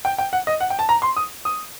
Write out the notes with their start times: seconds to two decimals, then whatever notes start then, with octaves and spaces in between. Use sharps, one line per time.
0.05 G5
0.18 G5
0.33 F#5
0.47 D#5
0.60 F#5
0.70 G5
0.79 A5
0.89 A#5
1.02 C6
1.16 D#6
1.45 D#6